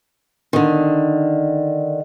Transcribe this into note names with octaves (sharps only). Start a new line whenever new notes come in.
D3 D#3